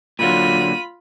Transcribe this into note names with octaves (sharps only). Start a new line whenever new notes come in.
A#2 D3 F#3 F4 B5 D#7